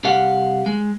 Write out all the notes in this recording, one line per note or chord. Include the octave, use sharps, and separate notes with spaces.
C2 G4 F5 F#5
G#3